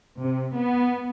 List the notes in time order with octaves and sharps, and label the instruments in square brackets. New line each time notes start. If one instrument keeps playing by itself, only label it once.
[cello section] C3
B3